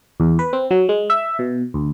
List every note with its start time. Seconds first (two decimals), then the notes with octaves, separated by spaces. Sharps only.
0.20 E2
0.39 B4
0.53 C4
0.71 F#3
0.89 G#3
1.10 E5
1.39 B2
1.74 D2